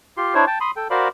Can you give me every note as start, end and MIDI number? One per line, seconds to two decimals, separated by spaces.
0.17 0.34 65
0.17 0.34 67
0.17 0.34 84
0.35 0.45 62
0.35 0.45 64
0.35 0.45 72
0.35 0.45 73
0.47 0.59 79
0.47 0.59 81
0.61 0.71 83
0.61 0.71 84
0.61 0.71 87
0.76 0.88 69
0.76 0.88 79
0.90 1.08 66
0.90 1.08 70
0.90 1.08 72
0.90 1.08 74
0.90 1.08 77
0.90 1.08 83